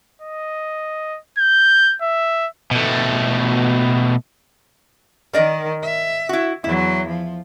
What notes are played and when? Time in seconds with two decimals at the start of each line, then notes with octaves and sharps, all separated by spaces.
0.22 D#5
1.38 G6
2.02 E5
2.71 B2 A3
5.33 D#3 A#4 D5 D#5
5.83 E5
6.29 E4 F#4
6.64 E2 F#3 E4
7.08 F3